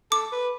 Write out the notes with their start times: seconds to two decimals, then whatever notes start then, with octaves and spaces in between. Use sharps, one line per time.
0.11 A4 D6
0.32 B4